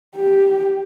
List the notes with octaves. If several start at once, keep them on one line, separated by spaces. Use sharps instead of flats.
G4